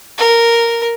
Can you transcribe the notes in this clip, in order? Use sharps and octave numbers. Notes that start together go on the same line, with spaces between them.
A#4